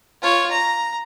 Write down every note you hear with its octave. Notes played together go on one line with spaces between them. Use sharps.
F4 C#5
A#5